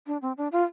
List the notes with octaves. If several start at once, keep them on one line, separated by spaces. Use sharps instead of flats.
D4
C4
D4
F4